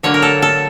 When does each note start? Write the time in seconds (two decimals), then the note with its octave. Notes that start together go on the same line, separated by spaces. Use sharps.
0.03 D3 F#3 A#3 C#5
0.14 A#4
0.22 A4
0.42 A4